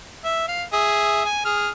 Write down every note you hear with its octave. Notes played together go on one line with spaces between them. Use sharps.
E5
F5
G#4 E5
G#5
G#4 F6